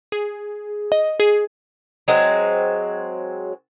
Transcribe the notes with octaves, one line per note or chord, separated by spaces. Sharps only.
G#4
D#5
G#4
F#3 G#3 C4